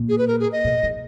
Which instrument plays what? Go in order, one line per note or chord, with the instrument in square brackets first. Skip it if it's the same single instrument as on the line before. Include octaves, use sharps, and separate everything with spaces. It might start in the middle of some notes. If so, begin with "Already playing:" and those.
Already playing: [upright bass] A#2
[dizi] G#4
B4
A#4
G#4
D#5
[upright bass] B2
D#3